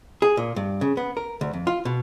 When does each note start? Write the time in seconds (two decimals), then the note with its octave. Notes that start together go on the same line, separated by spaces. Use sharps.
0.22 G#4
0.37 A#2
0.56 G2
0.81 C#3
0.97 B3
1.17 A#4
1.41 D2
1.53 F2
1.67 F4
1.85 B2